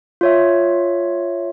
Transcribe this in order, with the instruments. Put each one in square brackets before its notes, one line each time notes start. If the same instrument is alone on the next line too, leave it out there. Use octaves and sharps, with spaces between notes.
[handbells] F4 C#5 E5